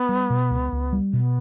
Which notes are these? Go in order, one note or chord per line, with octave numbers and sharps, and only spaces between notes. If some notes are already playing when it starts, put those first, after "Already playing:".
Already playing: B3
G3
B2
C#2
C#2
G3
B2 B3